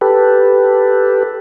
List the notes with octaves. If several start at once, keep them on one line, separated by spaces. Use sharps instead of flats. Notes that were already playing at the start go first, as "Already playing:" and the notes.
G4 A4 B4